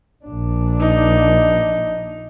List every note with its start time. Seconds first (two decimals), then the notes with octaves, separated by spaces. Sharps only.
0.25 A#1 D4
0.80 D#4